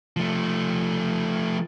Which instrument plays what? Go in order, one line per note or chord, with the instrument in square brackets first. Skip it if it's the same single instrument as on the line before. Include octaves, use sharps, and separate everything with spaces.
[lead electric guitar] F3 A3